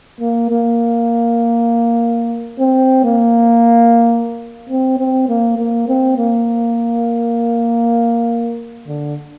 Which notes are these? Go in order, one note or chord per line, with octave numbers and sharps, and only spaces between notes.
A#3
A#3
C4
A#3
C4
C4
A#3
A#3
C4
A#3
D3